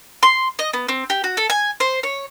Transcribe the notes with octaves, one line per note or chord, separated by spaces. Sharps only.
C6
D#5
B3
C4
G4
F#4
A4
G#5
C5
C#5